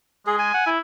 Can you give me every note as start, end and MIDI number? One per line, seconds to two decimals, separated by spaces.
0.27 0.51 56
0.27 0.36 68
0.39 0.70 80
0.54 0.63 78
0.66 0.79 64